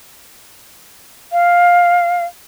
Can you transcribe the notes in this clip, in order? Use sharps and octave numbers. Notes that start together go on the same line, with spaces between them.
F5